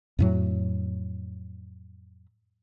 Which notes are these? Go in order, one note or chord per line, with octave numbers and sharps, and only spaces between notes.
F2 A2 F#3